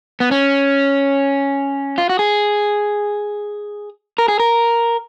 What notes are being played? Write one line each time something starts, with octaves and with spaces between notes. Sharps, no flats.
B3
C#4
F4
F#4
G#4
A#4
G#4
A#4